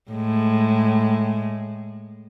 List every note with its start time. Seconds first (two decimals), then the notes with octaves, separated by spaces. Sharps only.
0.11 A2 G#3